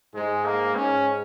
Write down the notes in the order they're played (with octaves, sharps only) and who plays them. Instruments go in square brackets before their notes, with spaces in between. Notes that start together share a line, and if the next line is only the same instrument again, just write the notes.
[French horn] G#2 [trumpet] G#3
[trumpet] A#3
[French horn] G#2 [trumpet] C#4